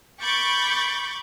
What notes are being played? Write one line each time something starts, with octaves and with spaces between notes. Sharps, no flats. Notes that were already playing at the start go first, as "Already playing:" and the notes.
B5 C#6 D6 G6 A6